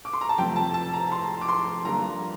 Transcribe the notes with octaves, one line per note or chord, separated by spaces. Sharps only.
D6
C6
A#5
A5
F2 C3 F3 A3 C4 G5
A5
A5
A#5
C6
D6
C6
G2 D3 F3 A#3 A#5